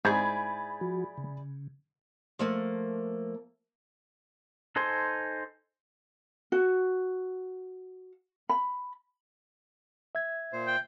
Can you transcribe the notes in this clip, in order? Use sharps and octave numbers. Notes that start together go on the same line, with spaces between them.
G#2 E4 G#4 D5 B5 G#6
F3 F#4
C#3
F3 A3 A#3
D#4 A4 C5 G#5 C6
F#4
B5
E5 G#6
A#2 C5
G5